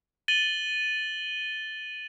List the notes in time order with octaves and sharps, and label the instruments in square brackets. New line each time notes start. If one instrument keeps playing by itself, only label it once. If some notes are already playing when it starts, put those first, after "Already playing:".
[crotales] A6 D#7 F#7 G7